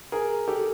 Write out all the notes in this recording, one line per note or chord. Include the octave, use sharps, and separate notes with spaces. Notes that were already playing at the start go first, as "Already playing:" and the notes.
G#4 A#4
G4 A4